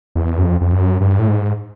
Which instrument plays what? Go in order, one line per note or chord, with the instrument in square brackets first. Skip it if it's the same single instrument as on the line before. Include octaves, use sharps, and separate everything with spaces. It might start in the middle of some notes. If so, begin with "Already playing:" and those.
[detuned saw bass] E2
F#2
F2
F2
F#2
G2
A2
G#2